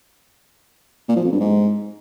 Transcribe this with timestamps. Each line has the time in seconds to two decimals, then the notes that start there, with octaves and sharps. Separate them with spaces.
1.08 A#2
1.16 F3
1.24 F2
1.32 G2
1.40 G#2